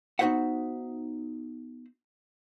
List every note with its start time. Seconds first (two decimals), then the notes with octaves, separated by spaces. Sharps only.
0.19 B3 D#4 F#4 C5 E5 F#5